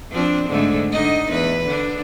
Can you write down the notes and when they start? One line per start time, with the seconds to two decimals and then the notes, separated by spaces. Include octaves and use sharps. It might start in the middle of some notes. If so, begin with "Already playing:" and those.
0.12 F3 C4 D4
0.50 G#2 D3 A3
0.92 D3 D#4 D#5
1.29 E2 B4
1.67 D3 D4